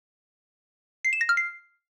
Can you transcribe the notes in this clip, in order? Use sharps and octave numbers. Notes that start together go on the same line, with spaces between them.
C7
E7
A#6
F6
C7